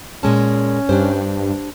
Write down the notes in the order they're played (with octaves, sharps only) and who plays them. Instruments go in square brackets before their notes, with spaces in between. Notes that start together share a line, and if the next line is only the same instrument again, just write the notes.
[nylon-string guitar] A#2 G#3 A5 [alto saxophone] C#4
[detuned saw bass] G2 [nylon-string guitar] D4 G4 C5